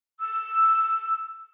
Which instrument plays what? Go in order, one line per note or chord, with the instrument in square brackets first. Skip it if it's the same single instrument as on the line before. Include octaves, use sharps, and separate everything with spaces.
[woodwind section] E6